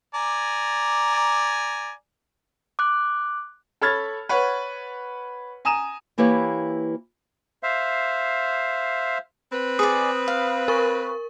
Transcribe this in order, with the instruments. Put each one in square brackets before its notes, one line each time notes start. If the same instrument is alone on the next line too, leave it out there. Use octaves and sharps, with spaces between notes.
[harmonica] D5 G#5 A#5
[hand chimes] D6 F#6
[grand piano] A4 C#5 B5 F6 G#6 A6
B4 C#5 F#5
G#5 A#5 D#6 D#7 E7
[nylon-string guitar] E3 A#3 E4 G4 B4 C#5
[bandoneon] C5 E5 F5
[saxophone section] C4 B4
[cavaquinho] G#4 D5 [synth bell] D#6
[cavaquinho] F5
[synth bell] A#4 C#6